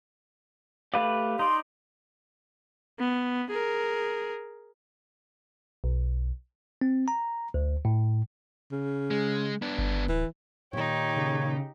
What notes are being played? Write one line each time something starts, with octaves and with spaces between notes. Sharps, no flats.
A3 G4 B4 D5 F5
D#4 D5 C6
B3
G#4 A#4
B1
C4
A#5
D2
A2
C#3
G#3
B3 D4
G1
D1 E3
A#2 D#3 D#4 G4 C#5
C#3